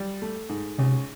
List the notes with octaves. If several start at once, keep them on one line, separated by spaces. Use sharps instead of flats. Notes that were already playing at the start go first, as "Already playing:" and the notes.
Already playing: G3
A3
G#2
C#2 C3